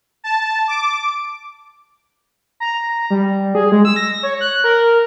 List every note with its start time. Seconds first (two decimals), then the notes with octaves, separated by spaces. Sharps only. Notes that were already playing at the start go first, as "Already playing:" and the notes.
0.24 A5
0.68 D6
2.60 A#5
3.10 G3
3.55 G#4
3.72 G#3
3.85 E6
3.96 A#6
4.23 C#5
4.41 F#6
4.64 A#4